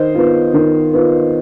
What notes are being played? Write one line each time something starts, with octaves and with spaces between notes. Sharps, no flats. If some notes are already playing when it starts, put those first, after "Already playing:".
Already playing: D#3 C5 D#5
B3 F4
D#3
B3 F4